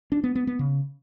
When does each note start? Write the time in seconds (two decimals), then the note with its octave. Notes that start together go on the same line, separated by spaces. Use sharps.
0.12 D4
0.24 B3
0.35 B3
0.47 B3
0.59 C#3